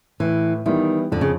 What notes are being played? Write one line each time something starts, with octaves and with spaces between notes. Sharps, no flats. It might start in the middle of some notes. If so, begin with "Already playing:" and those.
A2 E3
D#3 E3 G3 B3 E4
F2 D3
C#3